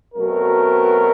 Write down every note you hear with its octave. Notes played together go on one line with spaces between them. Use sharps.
B2 F#3 A3 C4 A#4